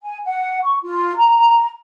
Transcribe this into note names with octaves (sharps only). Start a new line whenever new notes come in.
G#5
F#5
C#6
F4
A#5